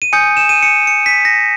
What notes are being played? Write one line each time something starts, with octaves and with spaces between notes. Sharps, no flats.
D#7
G#5 D#6 G6 C#7
E7
D#7
C#7
C#7
B6
A#6